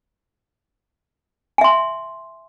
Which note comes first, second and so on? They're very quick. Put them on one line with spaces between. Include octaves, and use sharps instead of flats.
G#5 E5 C6